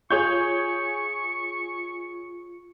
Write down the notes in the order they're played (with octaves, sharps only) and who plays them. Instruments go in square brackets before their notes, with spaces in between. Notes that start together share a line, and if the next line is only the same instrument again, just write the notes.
[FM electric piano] F4 [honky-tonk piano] G#4 C#5 G6 [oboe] C#6